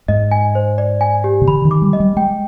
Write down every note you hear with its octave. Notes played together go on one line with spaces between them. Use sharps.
G#2 D#5
G#5
C5
D5
G#5
G4
C3
D3 B5
D#3
D6
G3
D#5
G3
G#3 G5